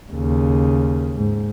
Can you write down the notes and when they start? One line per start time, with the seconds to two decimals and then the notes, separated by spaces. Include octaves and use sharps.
0.12 D#2 C#3
1.15 G#2